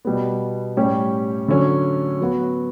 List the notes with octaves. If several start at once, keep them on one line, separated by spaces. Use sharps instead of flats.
B2 G3 B3
A2 G3 C#4 G4
D3 F#3 C#4
F#3 B3 F#4